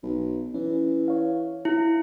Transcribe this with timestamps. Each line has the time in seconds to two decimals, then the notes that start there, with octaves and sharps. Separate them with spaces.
0.03 B1
0.54 E3 C#4
1.08 C#5 F5
1.65 E4